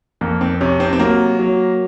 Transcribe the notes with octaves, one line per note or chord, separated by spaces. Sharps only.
F2 A#3
C4
C3 C#4
C4
C4
F#3 A#3
F#3